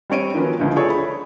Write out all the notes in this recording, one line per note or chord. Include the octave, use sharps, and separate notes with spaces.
G3 C4 C#5 D7 D#7
D#3 F3 F#3 B3 C#4
C#2 A2 D3 F3
G#4 A4 C#5 D5
B5